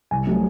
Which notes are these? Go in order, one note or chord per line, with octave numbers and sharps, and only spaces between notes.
C2 G#5
C3 F#3 A3